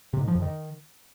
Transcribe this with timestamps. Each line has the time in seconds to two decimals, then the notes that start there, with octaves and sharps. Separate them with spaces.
0.13 C3
0.21 G#2
0.28 F3
0.35 F2
0.42 D#3